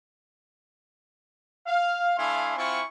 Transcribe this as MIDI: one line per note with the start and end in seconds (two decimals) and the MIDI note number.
1.66 2.13 77
2.17 2.54 57
2.17 2.54 62
2.17 2.54 64
2.17 2.54 77
2.17 2.54 80
2.17 2.54 84
2.57 2.82 60
2.57 2.82 64
2.57 2.82 65
2.57 2.82 80
2.57 2.82 85